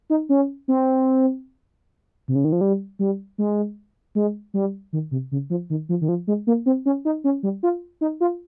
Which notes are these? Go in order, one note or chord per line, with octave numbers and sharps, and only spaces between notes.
D#4
C#4
C4
C3
C#3
D#3
F3
G3
G3
G#3
G#3
G3
D#3
C3
C#3
F3
D#3
F3
D#3
F3
G#3
A#3
C4
C#4
D#4
C#4
G3
F4
D#4
F4